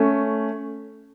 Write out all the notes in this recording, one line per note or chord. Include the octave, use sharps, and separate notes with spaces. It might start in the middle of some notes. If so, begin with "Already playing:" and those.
Already playing: A3 C#4